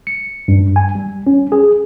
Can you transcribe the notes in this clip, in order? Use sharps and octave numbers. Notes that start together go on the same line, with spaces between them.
C#7
G2
G#5
G3
C#4
G#4